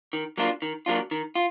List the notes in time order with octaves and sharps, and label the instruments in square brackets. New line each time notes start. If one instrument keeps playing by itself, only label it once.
[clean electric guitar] D#3
F#3 A#3 D4 F4
D#3
F#3 A#3 D4 F4
D#3
F4